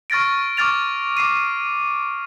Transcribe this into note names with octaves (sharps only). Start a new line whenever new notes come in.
C#6 F6 A6 A#6 D7
C#6 D6 F6 A6 F7
D6 C7 D#7